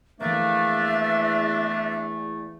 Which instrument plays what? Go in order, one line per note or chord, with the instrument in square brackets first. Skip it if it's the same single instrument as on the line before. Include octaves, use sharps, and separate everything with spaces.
[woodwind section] E2 A3 [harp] E3 A#3 [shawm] D4 [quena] E5